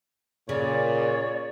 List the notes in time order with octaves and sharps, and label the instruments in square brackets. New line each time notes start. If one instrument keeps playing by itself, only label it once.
[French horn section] A#2 [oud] C#3 [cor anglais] C#5 [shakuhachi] D5